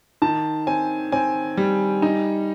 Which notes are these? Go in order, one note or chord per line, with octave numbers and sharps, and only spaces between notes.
D#3 A5
C4 G#5
C4 G#5
G3
D#4